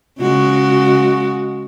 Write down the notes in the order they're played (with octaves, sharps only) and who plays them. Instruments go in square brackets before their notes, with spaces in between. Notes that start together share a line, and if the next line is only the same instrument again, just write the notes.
[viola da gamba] C#3 G#3 F#4